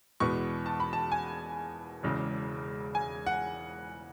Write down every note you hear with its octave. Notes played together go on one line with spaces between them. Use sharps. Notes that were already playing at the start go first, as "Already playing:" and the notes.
E2 B2 G#3 B3 C#6
A5
B5
A5
G#5
E1 E2 C#3 G#3
G#5
F#5